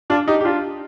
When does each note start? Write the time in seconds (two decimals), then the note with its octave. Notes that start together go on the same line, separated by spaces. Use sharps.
0.10 D4 F4
0.28 D#4 G4
0.41 G4
0.45 D4 F4